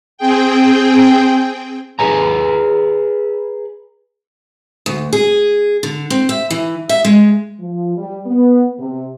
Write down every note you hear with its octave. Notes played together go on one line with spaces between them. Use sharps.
C4 G#4 G5
G#4 B4 G#5 A#5
D2
G#4
D3
C4
E5
E3
E5
G#3
F3
G3
B3
C3